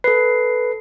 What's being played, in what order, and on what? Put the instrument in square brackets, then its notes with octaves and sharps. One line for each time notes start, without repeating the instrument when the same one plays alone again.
[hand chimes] A4 C7 [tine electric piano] B4